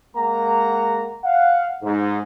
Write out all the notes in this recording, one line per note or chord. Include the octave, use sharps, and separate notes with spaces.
G#3 A#3 F#5 A#5
F5 F#5
G#2